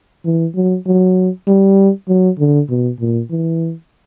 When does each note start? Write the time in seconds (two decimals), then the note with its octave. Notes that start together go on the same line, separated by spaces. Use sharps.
0.25 E3
0.55 F#3
0.86 F#3
1.47 G3
2.08 F#3
2.39 D3
2.70 B2
3.00 A#2
3.30 E3